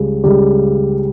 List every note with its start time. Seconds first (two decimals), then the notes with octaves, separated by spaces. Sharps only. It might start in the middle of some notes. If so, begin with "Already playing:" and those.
Already playing: C#2 C#3 G3
0.24 C#2 C#3 G3